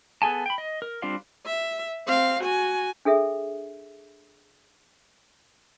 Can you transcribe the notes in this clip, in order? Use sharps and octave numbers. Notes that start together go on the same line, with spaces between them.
B3 G#4 A4 G#5 A5
G5 B5
D#5
A#4
G3 C4 D4 F4 F5
E5
C4 F5
F#4 G#5
D4 G#4 A4 E5